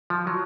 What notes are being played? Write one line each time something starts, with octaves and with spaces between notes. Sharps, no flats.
F3
F#3